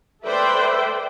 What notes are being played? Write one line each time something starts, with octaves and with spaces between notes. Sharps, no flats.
A4 B4 C5 D5 E5 G5